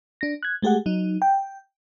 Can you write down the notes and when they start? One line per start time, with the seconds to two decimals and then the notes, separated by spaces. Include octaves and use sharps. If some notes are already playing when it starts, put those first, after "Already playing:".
0.21 D4 A#6
0.43 F#6 G#6
0.62 G#3 A3 G4 G#4 F#5
0.86 F#3 D#4
1.22 G5